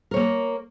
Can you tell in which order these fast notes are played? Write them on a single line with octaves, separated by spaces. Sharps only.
A#4 C#5 A#3